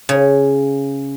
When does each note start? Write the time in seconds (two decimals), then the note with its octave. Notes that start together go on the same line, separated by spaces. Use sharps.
0.09 C#3